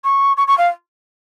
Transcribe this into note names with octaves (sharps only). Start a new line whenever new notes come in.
C#6
C#6
C#6
F5